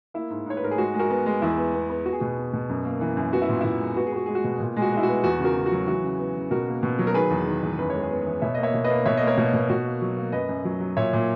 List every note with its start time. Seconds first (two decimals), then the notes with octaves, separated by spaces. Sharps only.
0.14 A#3 E4
0.30 G#2
0.46 G#2 C#5
0.57 B4
0.62 G#2 A#4
0.71 G#4
0.78 G#3 F#4
0.94 G#3
0.99 F#4 A#4
1.10 B3
1.26 G#3
1.42 E2 E4
1.58 B3
1.74 B3
1.90 B3
2.06 B3 F#4
2.13 G#4
2.20 B2 F#4
2.37 B3
2.53 B2
2.69 F#2
2.85 A#3
3.01 E3
3.17 F#2
3.33 B3 F#4
3.42 E4
3.49 A#2
3.61 A#2 E4
3.80 G#3
3.96 B3 F#4
4.07 G#4
4.12 B3 F#4
4.26 G#3 G#4
4.35 F#4
4.44 B2
4.60 A#2
4.77 G#3
4.82 F#4
4.92 G#3 E4
5.03 F#4
5.08 B3
5.24 E2 F#4
5.40 C#3 F#4 A#4
5.56 C#3
5.66 F#4
5.72 F#3
5.87 E3 F#4
6.03 C#3
6.19 B3
6.36 C#3
6.51 B2 F#4 A#4
6.67 A#3
6.83 B2
6.99 F#3
7.07 A#4
7.14 D#3 G#4 B4
7.31 E2
7.46 D#3
7.63 E2
7.78 F#2 B4
7.90 G#3 C#5
8.02 G#4 B4
8.11 B3
8.26 E3
8.42 B2 C#5 E5
8.55 A#3 D#5
8.63 C#5 E5
8.74 B2
8.84 B4 D#5
8.90 A#3
9.05 B2 C#5 E5
9.17 A#3 D#5
9.27 A#4 C#5
9.37 B2
9.53 B2
9.70 B2 F#4
9.86 A#3
10.02 F#3
10.17 A#3
10.32 F#2 B4 D#5
10.49 F#2
10.65 F#3
10.81 F#3
10.97 A#2 C#5 E5
11.13 A#2